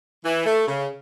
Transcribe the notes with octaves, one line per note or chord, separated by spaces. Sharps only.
E3
A3
C#3